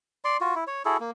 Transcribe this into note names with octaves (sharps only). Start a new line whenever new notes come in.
D5 C6
F4 F#4
E4
C#5
E4 F#4 G#4 A4
A#3